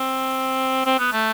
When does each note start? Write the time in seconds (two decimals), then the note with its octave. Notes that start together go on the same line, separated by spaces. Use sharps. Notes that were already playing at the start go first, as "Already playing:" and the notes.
Already playing: C4
0.86 C4
0.99 B3
1.13 A3